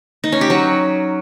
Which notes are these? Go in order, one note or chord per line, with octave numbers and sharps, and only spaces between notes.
D#4
C#4
G4
F#3